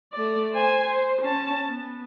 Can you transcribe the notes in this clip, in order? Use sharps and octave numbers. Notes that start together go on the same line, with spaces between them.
A3 D5
C5 G#5
C5
C#4 A5
B3